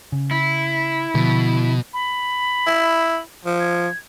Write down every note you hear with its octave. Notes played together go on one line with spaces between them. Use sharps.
C#3
E4
B2 D3 F3
B5
E4
F3
G#6